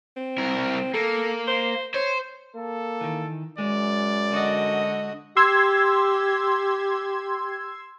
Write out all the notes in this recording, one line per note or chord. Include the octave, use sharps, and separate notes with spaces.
C4
C2 A#4
A#3 A4
C5
C5 C#5
A#3 A4
D#3 E3
F#2 G#3 D5
D3 F#4 D#5
G4 C6 E6 G#6